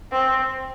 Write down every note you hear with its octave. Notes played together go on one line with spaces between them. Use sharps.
C4